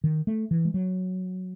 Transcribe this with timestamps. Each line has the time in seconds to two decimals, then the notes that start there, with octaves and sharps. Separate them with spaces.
0.04 D#3
0.27 A3
0.51 E3
0.65 G#3
0.74 F#3